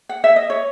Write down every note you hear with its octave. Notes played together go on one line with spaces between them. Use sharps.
F#5
E5
D#5
C#5